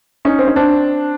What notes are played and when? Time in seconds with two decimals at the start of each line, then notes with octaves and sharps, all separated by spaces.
0.25 C#4 D#4
0.39 C4
0.48 C#4
0.56 C4 D4